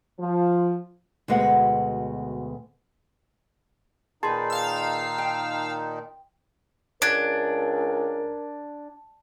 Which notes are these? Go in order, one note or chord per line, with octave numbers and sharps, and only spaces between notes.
F3
D2 B2 G#3 B3 F#5
A#2 D#3 D#4 G#4 B4 A5 C6
F5 E6
G5
C#2 D4 A#4 F#6 G#6 D7